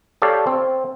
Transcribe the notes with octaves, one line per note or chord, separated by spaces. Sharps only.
G4 A4 C#5 D5 F5
C4